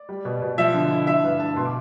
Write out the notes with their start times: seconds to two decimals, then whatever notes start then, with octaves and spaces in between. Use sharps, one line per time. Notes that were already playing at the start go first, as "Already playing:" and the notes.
Already playing: D5
0.09 G3
0.25 B2
0.42 B2
0.58 F3 E5
0.74 D3
0.91 E4
1.07 D3 E5
1.24 G2 B4
1.40 G2 A5
1.56 B2 C6
1.65 D6